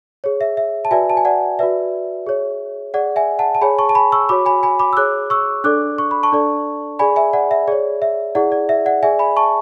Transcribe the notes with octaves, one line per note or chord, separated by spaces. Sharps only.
G#4 C#5
E5
E5
A5
F#4 B4 D5 E5 G#5
A5
G#5
D5 F#5
F#4 B4 D5 E5
G#4 C#5
G#4 D5 F#5
E5 G#5
F#5 A5
A5
G#4 C#5 G#5 B5
A5 C#6
A5
G#5 B5
C#6 E6
F#4 C#5 B5 D6
G#5 B5
G#5 B5
B5 D6
E6
G#4 C#5 D6 F#6
C#6 E6
D4 A4 D5 D6 F#6
C#6
B5
A5 C#6
D4 A4 D5
G#4 D5 G#5 B5
E5 G#5
D5 F#5
E5
G#4 C#5 D5
E5
E4 G#4 D5 F#5
D5
E5
D5 F#5
G#4 D5 E5 G#5
G#5 B5
A5 C#6